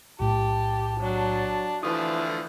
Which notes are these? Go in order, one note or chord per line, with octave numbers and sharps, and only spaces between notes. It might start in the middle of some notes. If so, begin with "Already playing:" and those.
B1 A2 G4 A5
F#3 D4
D3 E3 F3 A3 D#6